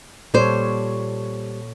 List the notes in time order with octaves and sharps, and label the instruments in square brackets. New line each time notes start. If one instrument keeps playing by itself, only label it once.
[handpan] A#2 A4 C#5 [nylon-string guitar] G3 C5